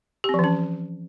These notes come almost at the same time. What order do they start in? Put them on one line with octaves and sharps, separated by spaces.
G4 C4 F3 E3 C#4